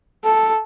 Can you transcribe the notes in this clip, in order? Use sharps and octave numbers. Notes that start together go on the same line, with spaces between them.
A4